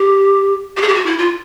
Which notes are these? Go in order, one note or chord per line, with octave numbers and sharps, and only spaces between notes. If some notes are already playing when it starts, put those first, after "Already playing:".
Already playing: G4
G4
G#4
G4
F#4
E4
F4